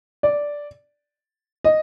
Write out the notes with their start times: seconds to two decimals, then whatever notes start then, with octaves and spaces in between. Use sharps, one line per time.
0.23 D5
1.64 D#5